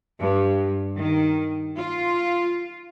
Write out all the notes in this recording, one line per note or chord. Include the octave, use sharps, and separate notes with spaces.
G2
D#3
F4